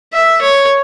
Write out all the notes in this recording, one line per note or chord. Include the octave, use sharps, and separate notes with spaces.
E5
C#5